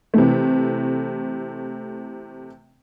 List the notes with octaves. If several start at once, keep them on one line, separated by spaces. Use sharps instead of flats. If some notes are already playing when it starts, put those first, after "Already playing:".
C3 E3 A3